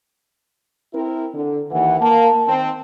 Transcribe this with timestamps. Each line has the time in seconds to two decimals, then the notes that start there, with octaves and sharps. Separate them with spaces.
0.94 C4 E4 A#4
1.34 D3
1.71 D#2 E3 F#5
2.01 A#3 A5
2.48 D#3 C4